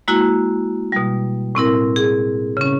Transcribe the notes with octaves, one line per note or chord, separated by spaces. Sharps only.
G#3 A#3 E4 F#4
B2 G3
A2 C4 E4 A#4
G#4
C#3 C#4